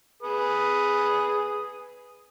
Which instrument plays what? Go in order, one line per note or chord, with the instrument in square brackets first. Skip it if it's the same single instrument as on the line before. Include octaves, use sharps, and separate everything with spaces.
[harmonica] G#4 B4 D#6